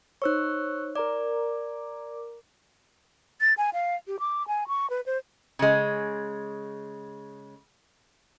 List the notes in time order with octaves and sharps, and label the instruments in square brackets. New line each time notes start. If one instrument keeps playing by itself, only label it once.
[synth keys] D#4 C5 C#5 [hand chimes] C#6 E6 F#6
[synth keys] A#4 A#5 D6 [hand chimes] D5
[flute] A6
G#5
F5
G4
D6
G#5
C#6
B4
C5
[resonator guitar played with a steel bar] C#3 G#3